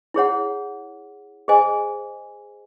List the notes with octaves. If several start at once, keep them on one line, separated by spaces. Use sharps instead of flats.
E4 G#4 C#5 F#5
G#4 C5 D#5 G#5